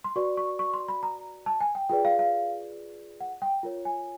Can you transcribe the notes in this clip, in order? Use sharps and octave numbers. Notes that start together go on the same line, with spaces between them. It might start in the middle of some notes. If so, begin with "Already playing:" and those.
C6
F#4 B4 D5 C#6
C#6
C#6
C6
B5
A#5
A5
G#5
G5
F4 G#4 B4 D5 G5
F5
F5
F#5
G5
F4 A#4 C#5
G#5